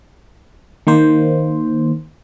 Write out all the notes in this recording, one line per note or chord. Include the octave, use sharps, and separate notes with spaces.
D#3 A#3 C5